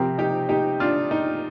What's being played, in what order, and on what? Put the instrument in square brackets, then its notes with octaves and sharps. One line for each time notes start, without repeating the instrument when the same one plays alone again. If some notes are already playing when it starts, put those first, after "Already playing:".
Already playing: [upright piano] C3 F3 C4 G4 A#4
D#4 G4
D#4 G4
D4 F4
D#4